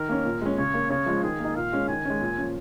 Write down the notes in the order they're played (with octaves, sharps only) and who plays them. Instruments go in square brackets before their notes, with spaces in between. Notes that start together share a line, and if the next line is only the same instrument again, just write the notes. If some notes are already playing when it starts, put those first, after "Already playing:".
Already playing: [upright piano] D#3 [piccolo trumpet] A#4
[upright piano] A#3 C#4
A#2
G#3 C#4
[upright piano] C#3 [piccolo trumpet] C#5
[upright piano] A#3 C#4
[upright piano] C#3 [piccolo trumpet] C#5
[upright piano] F3 G#3
[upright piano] D#3 [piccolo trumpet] G#4
[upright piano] A#3 D#4
[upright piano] A#2 [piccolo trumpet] F5
[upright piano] G#3 C#4
[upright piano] D#3 [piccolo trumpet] G#5
[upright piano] G#3 C#4
A#2
F3 C#4